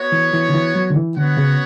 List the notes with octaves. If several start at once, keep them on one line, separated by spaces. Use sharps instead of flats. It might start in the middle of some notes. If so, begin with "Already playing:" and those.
Already playing: B3 F#4 C#5
E3
E3
D3
E3
F#3
D3
E3
D3 B3 F#4 C#5 F#5
C#3